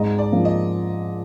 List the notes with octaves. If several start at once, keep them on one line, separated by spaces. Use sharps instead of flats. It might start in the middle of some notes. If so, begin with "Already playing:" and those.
Already playing: G#2 D5 D#5 A#5
D5
F3 A#3
D#5